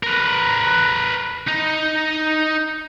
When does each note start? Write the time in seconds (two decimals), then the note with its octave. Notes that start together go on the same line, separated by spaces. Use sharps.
0.03 A#4 B4
1.48 D#4